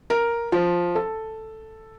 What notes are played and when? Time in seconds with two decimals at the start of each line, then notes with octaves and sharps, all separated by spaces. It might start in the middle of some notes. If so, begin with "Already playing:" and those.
0.10 A#4
0.52 F3
0.95 A4